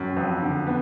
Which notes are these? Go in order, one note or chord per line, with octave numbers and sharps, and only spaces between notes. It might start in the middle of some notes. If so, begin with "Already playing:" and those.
Already playing: F#2
F2
D3
B3